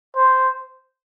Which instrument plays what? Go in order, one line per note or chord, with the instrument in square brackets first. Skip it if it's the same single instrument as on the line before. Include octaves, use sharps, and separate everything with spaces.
[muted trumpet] C5